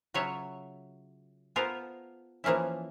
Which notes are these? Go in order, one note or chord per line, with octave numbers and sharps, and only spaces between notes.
C#3 F#3 F4 C#5 E5
B3 F4 A4 A#4 C5
E3 F3 A#3 C#4 E4